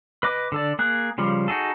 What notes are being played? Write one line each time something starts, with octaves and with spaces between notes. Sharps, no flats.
B4 D#5 D6
D3 A4 D5
A#3 G#4 F#6
C#3 F3 G3
D#4 F#4 G#4 A4